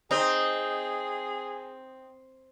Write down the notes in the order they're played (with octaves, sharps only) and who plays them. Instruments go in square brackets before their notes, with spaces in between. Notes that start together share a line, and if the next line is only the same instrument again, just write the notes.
[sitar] C4 [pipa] D#4 [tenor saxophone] G#4